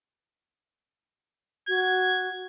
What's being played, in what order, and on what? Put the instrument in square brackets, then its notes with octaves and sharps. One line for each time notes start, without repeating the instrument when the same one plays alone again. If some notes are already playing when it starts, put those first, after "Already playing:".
[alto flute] F#4 [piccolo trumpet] G#6